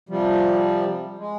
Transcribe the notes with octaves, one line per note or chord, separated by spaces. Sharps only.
C3 F3 G3
G#3